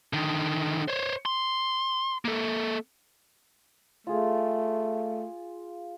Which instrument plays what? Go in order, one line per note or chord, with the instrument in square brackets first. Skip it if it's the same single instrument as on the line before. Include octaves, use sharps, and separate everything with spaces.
[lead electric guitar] D3 D#3
C5 C#5
C6
A#3 A4
[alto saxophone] A3 [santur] F4 G#4 F5